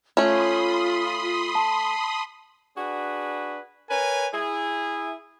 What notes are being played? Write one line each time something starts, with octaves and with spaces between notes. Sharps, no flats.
A3 C#4 F4 B5 C6 D#6
A5
D4 F#4 G#4 B4
A#4 B4 C#5 G#5
E4 G#4